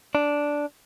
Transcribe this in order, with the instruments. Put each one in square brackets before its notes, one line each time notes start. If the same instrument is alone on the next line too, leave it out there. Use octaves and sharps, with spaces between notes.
[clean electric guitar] D4